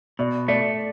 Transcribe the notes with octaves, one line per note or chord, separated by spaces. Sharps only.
B2 D5
A3 D5